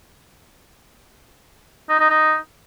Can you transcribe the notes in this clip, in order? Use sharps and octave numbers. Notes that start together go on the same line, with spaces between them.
D#4
D#4
D#4